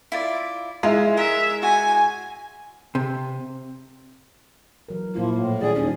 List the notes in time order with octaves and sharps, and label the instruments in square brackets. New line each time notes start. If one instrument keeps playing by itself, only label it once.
[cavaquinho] E4 F4 D5
[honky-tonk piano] G#3 E4 [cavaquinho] F4
[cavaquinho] A#4 [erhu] E5
[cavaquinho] F#4 [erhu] G#5
[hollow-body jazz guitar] C3
[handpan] E3 F#3 A#4
[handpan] A#2 E4 F4 [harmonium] F3 [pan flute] A#3
[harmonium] A2
[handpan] D#3 G3 D4 [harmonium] G#4 [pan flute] D5
[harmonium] D#2 [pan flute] C#4 [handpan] G4